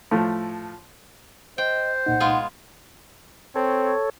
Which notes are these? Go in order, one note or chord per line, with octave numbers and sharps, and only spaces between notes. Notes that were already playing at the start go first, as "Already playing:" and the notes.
A2 F3 A3
C5 D#5 G5
C2 A#2 D#4 F#5
G#3 B3 F4
C4 A4 C#5